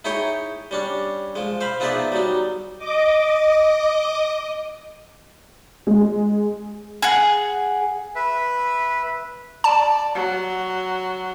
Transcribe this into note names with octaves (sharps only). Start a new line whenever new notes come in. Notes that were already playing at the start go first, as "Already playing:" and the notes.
D#4 E4 G#4 C#5 G5
G3 C#4 D4
F3 G#3
C5 F5 B5
F3 B3 D#4 G#4 D5 E5
F#3 G3 D#4
D#5 D6
G#3
G#4 F#5
B4 E5
D5 A5
F#3